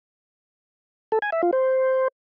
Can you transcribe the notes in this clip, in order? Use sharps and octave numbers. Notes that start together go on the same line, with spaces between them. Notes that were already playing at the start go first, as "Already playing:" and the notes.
A4
G#5
E5
F4
C5